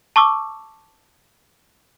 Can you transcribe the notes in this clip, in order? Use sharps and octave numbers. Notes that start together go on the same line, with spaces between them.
A5 C#6 D6 E6